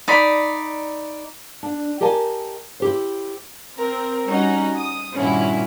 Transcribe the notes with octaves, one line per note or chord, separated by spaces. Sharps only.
D#4 D5 B5
D4
G4 A#4 D#5 G#5 A5
E4 G4 C5
C4 A#4
G3 C#4 D#4 F#4
D#6
G2 A#2 D#3 C#4 E4 F#4